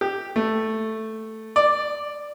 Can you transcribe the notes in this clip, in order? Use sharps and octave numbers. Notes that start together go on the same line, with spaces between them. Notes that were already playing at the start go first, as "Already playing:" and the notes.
G4
A3
D5